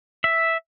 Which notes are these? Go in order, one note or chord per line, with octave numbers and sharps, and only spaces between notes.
E5